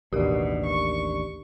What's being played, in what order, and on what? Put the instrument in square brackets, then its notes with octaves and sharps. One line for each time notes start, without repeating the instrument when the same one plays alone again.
[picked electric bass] A1 D#2 [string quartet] B2 [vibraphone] D4 D5 [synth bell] G4 A#4
[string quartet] C#6